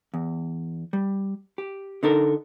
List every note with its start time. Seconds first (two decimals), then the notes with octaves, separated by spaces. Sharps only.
0.14 E2
0.93 G3
1.58 G4
2.03 D3 D#4 A4 A#4